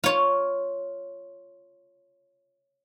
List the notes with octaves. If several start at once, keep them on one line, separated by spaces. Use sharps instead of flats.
F4 C#5